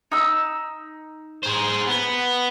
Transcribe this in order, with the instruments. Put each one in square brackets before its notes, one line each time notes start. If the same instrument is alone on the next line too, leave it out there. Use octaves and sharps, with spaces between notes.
[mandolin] D#4 E6
[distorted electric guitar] G#4 C5
B3